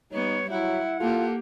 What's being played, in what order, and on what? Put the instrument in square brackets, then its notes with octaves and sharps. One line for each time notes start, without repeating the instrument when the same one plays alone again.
[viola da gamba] G3 B3 [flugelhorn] D#4 [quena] C#5
[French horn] F#3 [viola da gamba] E4 [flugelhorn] E5 [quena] F#5
[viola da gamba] A#3 G4 [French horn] F4 [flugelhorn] A4